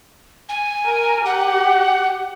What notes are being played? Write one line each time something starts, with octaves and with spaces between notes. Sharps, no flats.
G#5
A#4
G4 F#5